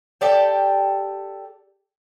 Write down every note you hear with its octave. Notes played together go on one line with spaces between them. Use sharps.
G4 A4 D5 G5